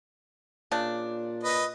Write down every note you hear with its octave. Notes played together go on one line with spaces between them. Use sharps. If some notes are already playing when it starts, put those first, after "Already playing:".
A#2 C#3 D4
B4 D#5